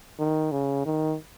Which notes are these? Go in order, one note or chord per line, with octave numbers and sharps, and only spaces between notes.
D#3
C#3
D#3